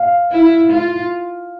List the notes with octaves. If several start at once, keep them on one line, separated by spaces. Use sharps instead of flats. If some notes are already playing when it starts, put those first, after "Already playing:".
Already playing: F5
E4
F4